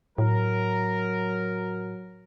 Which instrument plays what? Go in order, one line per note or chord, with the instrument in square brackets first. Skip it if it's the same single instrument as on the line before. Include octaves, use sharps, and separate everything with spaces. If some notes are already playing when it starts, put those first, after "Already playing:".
[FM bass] A2 [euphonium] F#3 [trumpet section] A#4